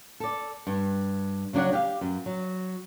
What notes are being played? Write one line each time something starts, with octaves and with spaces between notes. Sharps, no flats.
A4 D5
G2
C#3 F#3 D4 C#5 F#5
G4 F5
F#2
F#3